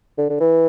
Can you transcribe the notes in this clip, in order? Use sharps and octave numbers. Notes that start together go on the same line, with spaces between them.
D3
D3
E3